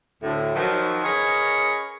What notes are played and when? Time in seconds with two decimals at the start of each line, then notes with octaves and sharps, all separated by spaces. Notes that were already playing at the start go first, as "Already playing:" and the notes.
0.22 D2 A2
0.54 D#3 F3 F#3
1.03 C#4 G#4 A#4 B4 C#5 D#5